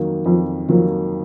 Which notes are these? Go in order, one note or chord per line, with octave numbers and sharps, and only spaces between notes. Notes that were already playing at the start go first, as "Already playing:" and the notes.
Already playing: F2 D#3 F#3 A#3
F2 F3
D#3 F3 F#3 A#3